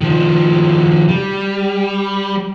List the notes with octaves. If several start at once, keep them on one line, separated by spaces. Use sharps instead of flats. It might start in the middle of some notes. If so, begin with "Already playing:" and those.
D#3 F3
G3